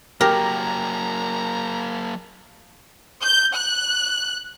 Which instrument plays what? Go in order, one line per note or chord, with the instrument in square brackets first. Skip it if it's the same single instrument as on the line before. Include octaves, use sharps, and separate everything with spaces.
[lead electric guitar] F#3 A#3 [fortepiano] G4 [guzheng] A#4 [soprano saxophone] A#5
[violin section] G6
F#6